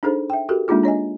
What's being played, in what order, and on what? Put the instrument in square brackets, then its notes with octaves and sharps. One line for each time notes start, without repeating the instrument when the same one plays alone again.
[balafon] D4 D#4 G#4 A4 C5
E5 G5
F#4 G4 A4 A#4
G#3 A#3 D4 D#4 F4 G#4
D4 C#5 D#5 G#5